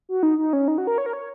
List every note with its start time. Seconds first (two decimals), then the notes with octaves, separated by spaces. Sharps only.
0.09 F#4
0.23 D#4
0.38 D#4
0.53 C#4
0.68 D#4
0.78 F#4
0.87 A#4
0.98 C#5
1.06 A#4
1.13 C#5